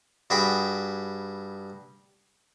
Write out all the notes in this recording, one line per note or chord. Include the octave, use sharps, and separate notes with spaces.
G2 F#4 G#4 G5 B5